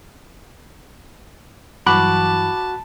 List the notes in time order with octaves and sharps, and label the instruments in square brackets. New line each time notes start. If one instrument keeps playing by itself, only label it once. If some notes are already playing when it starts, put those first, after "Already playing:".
[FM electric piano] G2 E3 F#3 [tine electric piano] F#4 F#6 [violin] A5 [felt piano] B5 D6